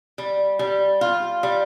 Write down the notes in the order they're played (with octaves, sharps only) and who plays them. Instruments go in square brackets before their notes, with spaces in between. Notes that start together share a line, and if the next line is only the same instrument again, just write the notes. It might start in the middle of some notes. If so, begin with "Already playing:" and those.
[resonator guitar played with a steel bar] G3
G3
F4
G3